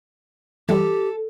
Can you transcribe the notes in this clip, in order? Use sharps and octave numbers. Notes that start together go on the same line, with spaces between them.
E3 G3 G4 A4